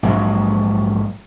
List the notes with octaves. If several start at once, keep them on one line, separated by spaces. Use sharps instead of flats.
A#1 G#2 F#3 G#3